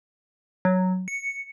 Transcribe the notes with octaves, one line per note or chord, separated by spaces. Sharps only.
F#3
C#7